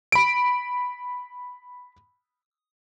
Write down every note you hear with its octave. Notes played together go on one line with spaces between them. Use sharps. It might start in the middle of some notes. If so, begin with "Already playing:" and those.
B5 D7